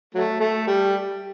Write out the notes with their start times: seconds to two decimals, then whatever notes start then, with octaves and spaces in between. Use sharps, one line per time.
0.15 F#3 A3
0.40 A3
0.68 G3